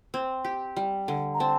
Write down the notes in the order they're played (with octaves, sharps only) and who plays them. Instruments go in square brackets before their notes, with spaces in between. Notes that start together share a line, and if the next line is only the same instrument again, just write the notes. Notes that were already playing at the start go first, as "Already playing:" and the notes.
[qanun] C4
G4
G3
D3
[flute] A#5
[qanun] C4 [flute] A5